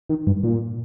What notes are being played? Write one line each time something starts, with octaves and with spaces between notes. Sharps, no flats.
D#3
G2
A#2